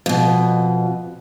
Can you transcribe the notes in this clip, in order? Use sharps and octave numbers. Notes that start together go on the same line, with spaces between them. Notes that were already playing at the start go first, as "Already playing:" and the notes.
F2 B2